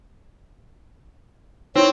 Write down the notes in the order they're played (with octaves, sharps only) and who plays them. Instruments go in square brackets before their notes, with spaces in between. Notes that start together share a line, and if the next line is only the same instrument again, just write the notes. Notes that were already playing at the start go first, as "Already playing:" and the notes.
[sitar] C4 [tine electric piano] D#4 E4 [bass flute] C#5